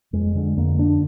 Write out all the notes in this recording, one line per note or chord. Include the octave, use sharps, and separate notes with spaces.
F2 G#3
D3 G#3
F2 A#3
D3 D4